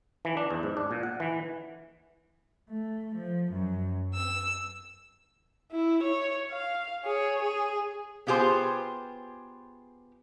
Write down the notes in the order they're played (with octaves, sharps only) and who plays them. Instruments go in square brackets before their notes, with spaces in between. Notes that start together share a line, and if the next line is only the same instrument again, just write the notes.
[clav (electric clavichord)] E3
D4
E2
G#2
D4
A#2
F#5
E3
[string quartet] A3
F3
F#2
E6
[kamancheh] E4
C#5
F5
G#4 C#5
G#4
[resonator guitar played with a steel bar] B3 F4 G4 G#4 C5